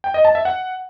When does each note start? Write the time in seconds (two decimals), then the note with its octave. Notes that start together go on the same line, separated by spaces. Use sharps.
0.04 G5
0.14 D#5
0.25 A5
0.35 E5
0.45 F#5